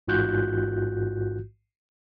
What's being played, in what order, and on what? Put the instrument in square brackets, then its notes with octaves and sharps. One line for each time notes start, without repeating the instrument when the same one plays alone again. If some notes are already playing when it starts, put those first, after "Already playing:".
[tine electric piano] A1 G#2 F4 F#4 F#6 G6